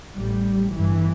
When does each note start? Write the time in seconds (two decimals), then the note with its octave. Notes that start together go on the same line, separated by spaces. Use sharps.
0.17 A1 A2 G3
0.73 G1 G2 E3